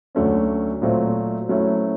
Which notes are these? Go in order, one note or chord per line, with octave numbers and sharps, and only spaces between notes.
D2 D3 F#3 A3 C#4
A#2 F#3 A3 C4
F#3 A3 C#4 E4